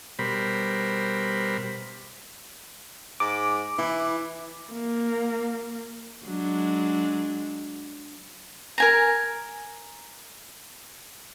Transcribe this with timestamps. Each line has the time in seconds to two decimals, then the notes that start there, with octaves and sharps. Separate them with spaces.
0.19 B2 G3 A#4 C5 B5
3.20 G#2 D6
3.78 E3 E4
4.72 A#3
6.25 F#3 G#3 D4
8.78 A#4 G#5 A#5